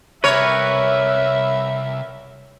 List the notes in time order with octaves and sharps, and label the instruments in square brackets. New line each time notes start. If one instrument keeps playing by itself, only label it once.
[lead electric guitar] C2 [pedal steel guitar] G4 A#4 B4 [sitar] C#5 [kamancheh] E5